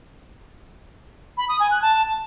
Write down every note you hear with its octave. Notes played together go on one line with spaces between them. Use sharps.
B5
D#6
G#5
F#6
A5